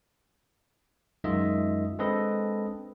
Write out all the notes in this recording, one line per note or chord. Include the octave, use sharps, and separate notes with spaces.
F#2 D#3 G#3 F4 D#5 E5
G#3 C4 D4 A4 B4 D#5